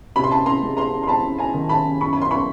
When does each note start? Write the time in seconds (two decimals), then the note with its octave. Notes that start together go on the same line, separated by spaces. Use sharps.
0.16 C3 B5
0.24 C6
0.31 A5 B5
0.46 A#5 C6
0.61 G#3
0.77 A#5 C6
1.03 C6
1.08 C4 A5 B5
1.38 G#5 A#5
1.54 D#3
1.69 A5 B5
2.01 F#2 B5 C#6
2.13 B5
2.22 C6
2.31 B5 C#6